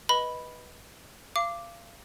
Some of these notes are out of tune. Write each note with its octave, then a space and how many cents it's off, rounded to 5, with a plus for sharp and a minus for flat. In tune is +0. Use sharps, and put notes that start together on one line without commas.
B4 -15 D#5 +10 B5 +0
F5 -30 D6 +0